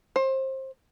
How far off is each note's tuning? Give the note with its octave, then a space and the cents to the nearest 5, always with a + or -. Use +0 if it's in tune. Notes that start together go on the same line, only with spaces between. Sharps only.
C5 +25